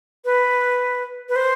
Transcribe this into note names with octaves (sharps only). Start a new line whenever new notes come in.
B4
B4
C5